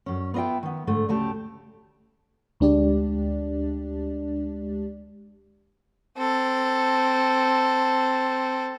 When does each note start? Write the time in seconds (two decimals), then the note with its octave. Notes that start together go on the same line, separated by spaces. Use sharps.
0.06 F#2 C#4
0.34 B3 F4 D#5 E5 G5
0.63 D#3 B3
0.87 G#2 D3 A3
1.09 D2 C#3 A3 G4 A5
2.60 D2 G#3 D4 G4 D5
6.17 C4 A4